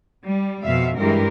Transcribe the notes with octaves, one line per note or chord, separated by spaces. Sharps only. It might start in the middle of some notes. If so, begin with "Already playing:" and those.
G3
F2 B2 E5 F5
G2 E3 G#3 G4 A#4